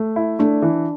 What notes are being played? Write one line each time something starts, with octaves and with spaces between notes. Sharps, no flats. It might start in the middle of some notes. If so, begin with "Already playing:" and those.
Already playing: A3
E4
A3 D4
E3